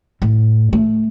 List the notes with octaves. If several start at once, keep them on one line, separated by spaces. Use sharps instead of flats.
A2
A3